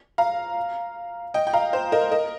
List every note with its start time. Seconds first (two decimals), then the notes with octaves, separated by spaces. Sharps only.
0.18 F5 A#5
1.34 D#5 G5
1.47 G5
1.53 F5 A#5
1.73 C5
1.92 A#4 D#5
2.11 A#4 D#5